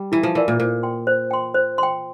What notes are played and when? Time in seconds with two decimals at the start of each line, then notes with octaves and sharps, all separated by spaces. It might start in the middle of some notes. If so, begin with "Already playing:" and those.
Already playing: G3
0.12 E3 E4
0.23 F3
0.35 E3 A#4 D5 F5
0.48 A#2
0.59 A#2 C5
0.83 G5 C6
1.07 C5
1.31 G5 C6
1.54 C5
1.78 G5 C6